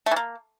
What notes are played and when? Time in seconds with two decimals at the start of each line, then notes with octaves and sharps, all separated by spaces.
0.06 A3
0.11 E3
0.16 A#3